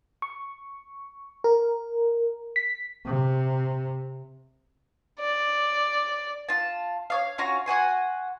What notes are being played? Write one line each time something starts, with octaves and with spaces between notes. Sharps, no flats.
C#6
A#4
B6
C3
D5
F4 A5
C#5 D5 F5
C#4 F4 F#4 A#5
F#4 F#5 G#5 C6